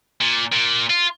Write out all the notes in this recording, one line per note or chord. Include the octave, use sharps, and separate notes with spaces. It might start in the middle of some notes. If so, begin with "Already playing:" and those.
A#2
A#2
F4